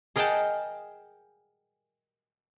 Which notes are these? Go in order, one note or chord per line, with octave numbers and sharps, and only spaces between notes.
G#4 A#4 D#5 F#5 G5 A5